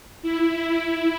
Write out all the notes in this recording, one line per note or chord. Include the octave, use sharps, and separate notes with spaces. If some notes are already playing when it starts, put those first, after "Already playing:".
E4